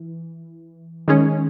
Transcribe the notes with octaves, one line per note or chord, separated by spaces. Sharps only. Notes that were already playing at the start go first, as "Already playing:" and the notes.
Already playing: E3
D#3 G#3 C#4